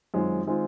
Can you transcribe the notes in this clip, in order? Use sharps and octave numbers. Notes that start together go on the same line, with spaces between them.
F#2 D#3 G#3 C4 F4
D#3 G#3 C4 F4